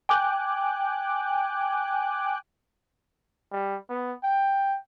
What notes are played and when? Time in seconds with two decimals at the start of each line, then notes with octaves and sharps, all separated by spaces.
0.09 G5 G#5 D6 F#6
3.52 G3
3.89 B3
4.24 G5